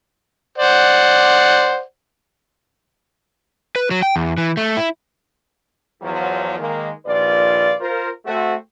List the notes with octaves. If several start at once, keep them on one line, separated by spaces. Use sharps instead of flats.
C5 D5 F#5
B4
F#3
G5
E2
E3
A3
E4
E2 F3 F#3
D#3 G#3 A#3
A#1 D#2 F4 B4 D5
F4 A#4 C5
A3 C4 F#4